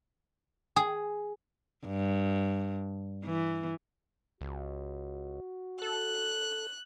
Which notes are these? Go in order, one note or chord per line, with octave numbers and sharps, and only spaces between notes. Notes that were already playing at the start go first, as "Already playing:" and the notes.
G#4
G2
E3
C#2 F#4
A4 F#6